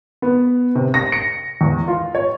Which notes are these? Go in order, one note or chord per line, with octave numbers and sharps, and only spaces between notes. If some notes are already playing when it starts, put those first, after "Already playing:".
B3
C3
A#6
C#7
E2
F4
C#5